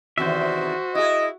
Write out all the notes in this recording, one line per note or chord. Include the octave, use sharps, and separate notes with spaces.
E2 C3 D#3 F#4 C5 E5
E4 G#4 D#5